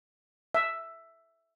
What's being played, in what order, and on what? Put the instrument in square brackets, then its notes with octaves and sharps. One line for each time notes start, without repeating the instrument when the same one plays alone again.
[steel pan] E5